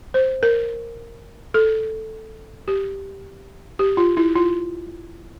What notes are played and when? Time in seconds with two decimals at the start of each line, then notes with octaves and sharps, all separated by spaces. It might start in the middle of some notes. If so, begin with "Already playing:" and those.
0.14 C5
0.43 A#4
1.54 A4
2.68 G4
3.79 G4
3.97 F4
4.17 E4
4.36 F4